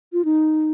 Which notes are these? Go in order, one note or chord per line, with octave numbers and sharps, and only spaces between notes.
F4
D#4